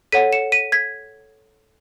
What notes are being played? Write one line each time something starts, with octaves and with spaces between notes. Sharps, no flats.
A4 C#5 F#5 B6 D#7
C#7 E7
B6 D#7
G#6 B6